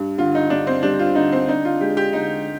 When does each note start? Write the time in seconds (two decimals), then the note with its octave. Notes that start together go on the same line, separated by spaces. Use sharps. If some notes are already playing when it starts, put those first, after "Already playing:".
Already playing: G2
0.18 D3 F4
0.35 D#4
0.50 G2 D4
0.67 C4
0.83 G3 D4
0.99 F4
1.15 D3 D#4
1.32 C4
1.48 D4 D#4
1.65 F4
1.81 G#3 G4
1.97 G4
2.13 D3 D#4